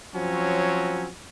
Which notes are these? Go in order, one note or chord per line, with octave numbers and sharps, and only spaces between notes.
F3 F#3 C4 C#4